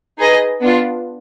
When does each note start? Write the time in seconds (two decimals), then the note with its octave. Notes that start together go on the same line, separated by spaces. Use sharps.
0.18 D#4 G#4 B4 D#5
0.61 B3 D4 F4